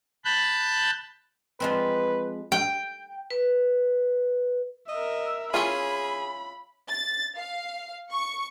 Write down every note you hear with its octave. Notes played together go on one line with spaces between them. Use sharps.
A5 B5 F#6 G6
F3 G#3 C4 B4
G5
B4
A#4 D#5 E5
C#4 E4 F4 G#4 B5
A6
F5
C#6